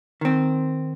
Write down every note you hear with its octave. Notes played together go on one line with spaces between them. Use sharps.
D#3 C4